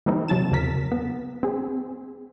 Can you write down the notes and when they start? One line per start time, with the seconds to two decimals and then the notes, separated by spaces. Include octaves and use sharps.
0.06 E3 G3 A#3 C4 D#4 E4
0.28 C3 F#3 A5 A6 E7
0.52 E2 C#3 A#4 B6
0.92 B3
1.43 C4 G#4